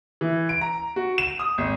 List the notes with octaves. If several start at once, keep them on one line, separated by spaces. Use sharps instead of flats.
E3
D7
A#5
F#4
E7
D#6
G#1